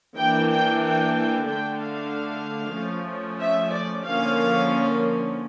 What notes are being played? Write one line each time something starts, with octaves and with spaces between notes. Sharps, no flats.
E3 A#3 D4 G5
G5
G5
D3 A3 D4 G5
F5
F3 A3 C#4
E5
D5
D3 F3 A#3 C#4 F5